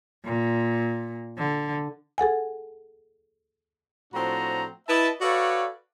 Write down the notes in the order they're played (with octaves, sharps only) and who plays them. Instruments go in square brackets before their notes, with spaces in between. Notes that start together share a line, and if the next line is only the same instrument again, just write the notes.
[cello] A#2
D3
[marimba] G#4 A4 F#5 G#5
[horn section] A2 F3 C4 D4 F#4 A#5
E4 B4 D#5 E5 A5
F#4 A4 B4 C#5 D5 F5